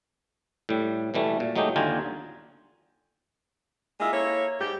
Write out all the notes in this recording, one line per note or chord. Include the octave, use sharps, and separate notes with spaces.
A2 G3
B2 E3 G3 A3
A#2
F#3 G#3 A3 D#4 G4
D#2 D3 F4 G5 G#5 A#5
G#3 A#3 F4 D#5 E5
A#3 E4 A4 C#5
G#2 G4